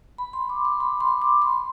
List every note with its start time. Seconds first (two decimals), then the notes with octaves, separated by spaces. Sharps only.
0.18 B5
0.33 C6
0.50 D6
0.65 C6
0.80 B5
1.00 C6
1.22 D6
1.42 C6